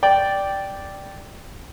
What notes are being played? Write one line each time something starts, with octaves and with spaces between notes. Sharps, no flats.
D5 G5